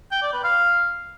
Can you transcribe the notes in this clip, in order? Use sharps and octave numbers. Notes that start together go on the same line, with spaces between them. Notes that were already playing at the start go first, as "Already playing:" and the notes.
G5
D5
B4
F5